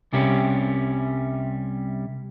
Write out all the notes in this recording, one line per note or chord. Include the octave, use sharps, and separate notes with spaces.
C2 C3 G3 C#4